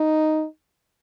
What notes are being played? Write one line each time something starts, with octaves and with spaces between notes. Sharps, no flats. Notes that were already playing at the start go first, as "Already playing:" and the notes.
Already playing: D#4